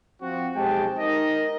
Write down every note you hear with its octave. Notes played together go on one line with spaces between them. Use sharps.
F3 C4 F#4
B1 G#3 G4 C5 G5 A5
D#4 A#4 D#5